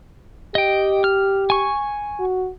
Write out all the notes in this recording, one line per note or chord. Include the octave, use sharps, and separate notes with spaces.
G4 D#5 G5
F6
G#5 C#6
F#4